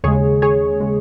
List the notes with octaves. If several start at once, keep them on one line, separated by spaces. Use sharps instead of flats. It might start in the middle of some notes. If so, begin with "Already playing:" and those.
D#2 C#3 G#3 G#4 C#5
G#4 C#5
C#3 G#3